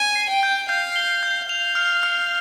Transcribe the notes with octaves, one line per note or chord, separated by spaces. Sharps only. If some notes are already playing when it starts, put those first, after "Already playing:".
Already playing: G#5
C7
G5
G6
F5 G6
G7
G6
F5 F7
F6
F6